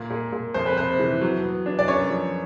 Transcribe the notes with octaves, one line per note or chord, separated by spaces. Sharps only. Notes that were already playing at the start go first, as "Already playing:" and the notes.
Already playing: A#2
A#2
A#2
F2 C5
B4
C3 C5
E3
F#3
B3
D4
D5
F#2 C#5
F3